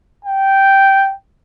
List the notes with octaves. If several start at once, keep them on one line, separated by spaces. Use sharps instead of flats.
G5